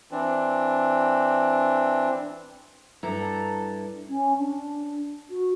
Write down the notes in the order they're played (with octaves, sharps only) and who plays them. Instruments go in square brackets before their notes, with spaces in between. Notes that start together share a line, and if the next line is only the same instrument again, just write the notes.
[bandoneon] E3 C4 D4
[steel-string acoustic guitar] G2 E4 A4 A#5
[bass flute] C#4
D4
F#4